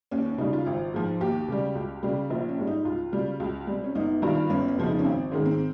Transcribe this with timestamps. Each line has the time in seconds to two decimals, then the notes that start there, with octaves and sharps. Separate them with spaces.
0.11 D#2 C#4
0.25 C#4
0.38 C#3 G3 D#4
0.53 F4
0.66 G#1
0.94 G#2 F3
1.21 D#2 G4
1.48 C#3 G3
1.75 C#2
2.03 C#3 G3
2.30 A#1 F4
2.49 C#4
2.58 G#2 G3
2.67 D#4
2.85 C#2 F4
3.13 C#3 G3
3.40 C#2
3.67 C3 G3
3.84 C#4
3.95 G1 D#4
4.22 G2 D#3 G3 F4
4.49 G1 C#4
4.68 C#4
4.77 F2 C#3 F3 G#3
4.86 D#4
4.99 C#4
5.04 G#1 C4
5.31 G#2 D#3 G#3 C#4
5.45 C4